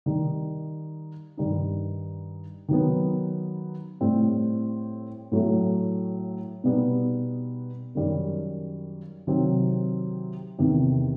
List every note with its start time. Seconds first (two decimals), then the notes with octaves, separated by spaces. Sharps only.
0.06 D#3 G3 D#4
1.37 G2 D#3 G3 D#4
2.69 D#3 F#3 B3
4.01 A2 G3 C4
5.32 A2 F#3 A3
6.64 B2 G3 B3 D#4
7.95 F#2 D#3 G3
9.27 C3 D#3 F#3 C4
10.59 E2 C3 D#3